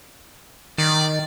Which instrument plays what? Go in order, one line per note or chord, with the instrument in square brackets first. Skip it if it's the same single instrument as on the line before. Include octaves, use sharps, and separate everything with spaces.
[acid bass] D#3 [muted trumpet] D5